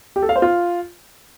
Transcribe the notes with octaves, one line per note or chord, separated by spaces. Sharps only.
G4
A4
F5
C5
F4